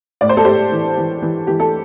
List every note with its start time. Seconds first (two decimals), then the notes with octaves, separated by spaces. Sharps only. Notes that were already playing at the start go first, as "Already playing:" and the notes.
0.21 A2 D5
0.29 C5
0.37 A4
0.45 A2 G4 C5
0.72 E3
0.97 E3
1.22 E3
1.47 E3 G4
1.60 A4